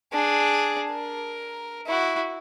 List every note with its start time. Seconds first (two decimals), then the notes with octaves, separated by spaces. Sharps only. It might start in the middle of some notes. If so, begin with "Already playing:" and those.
0.13 D4 G#4
0.91 A#4
1.87 E4 F#4